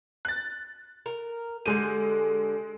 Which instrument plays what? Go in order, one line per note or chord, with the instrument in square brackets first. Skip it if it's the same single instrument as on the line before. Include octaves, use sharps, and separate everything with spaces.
[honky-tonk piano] F#6 A6
[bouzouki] A#4
[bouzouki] D3 G3 [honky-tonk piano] G#3 A4 D#7